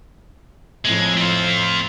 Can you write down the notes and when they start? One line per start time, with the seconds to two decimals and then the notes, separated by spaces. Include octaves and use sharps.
0.85 F2 A2 G#3
1.17 C4 F4